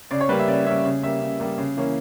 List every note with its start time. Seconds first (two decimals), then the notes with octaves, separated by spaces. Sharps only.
0.11 C#3 D5
0.21 C#5
0.29 G3 A#3 C#4 B4
0.39 E5
0.47 C#3 D5
0.66 G3 A#3 C#4 E5
0.85 C#3
1.03 G3 A#3 E5
1.21 C#3
1.39 G3 A#3
1.58 C#3
1.77 E3 A#3 C#4